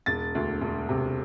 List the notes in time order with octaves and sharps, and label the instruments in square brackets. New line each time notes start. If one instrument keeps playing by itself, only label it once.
[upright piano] E1 A6
D2
E1
C3